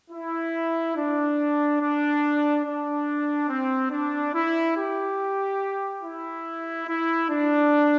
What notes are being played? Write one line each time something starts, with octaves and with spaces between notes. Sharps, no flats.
E4
D4
D4
D4
C4
D4
E4
G4
E4
E4
D4